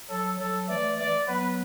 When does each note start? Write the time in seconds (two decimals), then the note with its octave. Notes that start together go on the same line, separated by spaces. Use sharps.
0.10 F#3 A4
0.40 F#3 A4
0.69 E3 A3 D5
0.98 D5
1.28 F#3 B3 B4